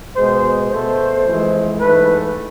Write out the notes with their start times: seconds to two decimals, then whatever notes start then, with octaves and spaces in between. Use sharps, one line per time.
0.16 B2 G#3 C5
0.71 B2 A3 C5
1.25 F2 E3 G#3
1.80 G#2 E3 A3 B4